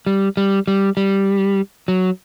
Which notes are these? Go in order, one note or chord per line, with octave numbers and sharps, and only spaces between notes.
G3
G3
G3
G3
F#3